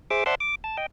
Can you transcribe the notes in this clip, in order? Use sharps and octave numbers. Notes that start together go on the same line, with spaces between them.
G#4 C5 E5 D6
C5 D5 E5 F#5 A5 C6
D6
A5
D#5 G5